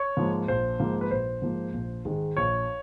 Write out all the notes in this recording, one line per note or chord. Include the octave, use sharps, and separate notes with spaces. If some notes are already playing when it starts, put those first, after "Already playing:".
Already playing: C#5
G#2 F3 A#3
A#1 C5
G#2 F3 A#3
B4
A#1 C5
G#2 F3 A#3
A#1
G#2 D#3 G#3
A#1 C#5